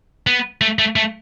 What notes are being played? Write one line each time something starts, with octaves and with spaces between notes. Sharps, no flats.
B3
A3
A3
A3